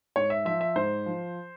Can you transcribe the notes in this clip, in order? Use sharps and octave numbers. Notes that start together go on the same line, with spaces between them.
G#2 C#5
E5
F3 E5
E5
G#2 C5
F3